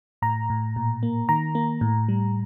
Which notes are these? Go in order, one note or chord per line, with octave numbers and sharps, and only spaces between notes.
A2 A#5
A2
A#2
A#3
D#3 A#5
A#3
A2
G3